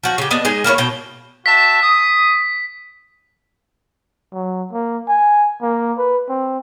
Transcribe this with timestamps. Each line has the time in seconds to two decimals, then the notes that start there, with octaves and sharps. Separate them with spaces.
0.04 F3 F#4
0.18 C#3 G4
0.31 B3 D4 D#5
0.45 G#3 D#4 G#4
0.64 A#3 E4 A#4 C#5
0.78 B2 G5
1.46 F#4 E5 A5 B6
1.81 D#6
4.33 F#3
4.72 A#3
5.08 G#5
5.62 A#3
5.98 B4
6.29 C4